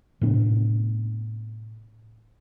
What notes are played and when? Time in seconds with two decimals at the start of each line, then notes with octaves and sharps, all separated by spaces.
0.21 A2 C3 B3 D4